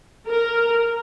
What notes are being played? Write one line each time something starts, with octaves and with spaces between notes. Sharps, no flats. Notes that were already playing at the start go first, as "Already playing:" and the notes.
A#4